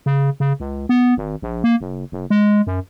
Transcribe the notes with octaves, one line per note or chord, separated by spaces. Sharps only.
C#3
C#3
C#2
B3
G#1
A#1
A#3
F#1
F#1
G#3
F#2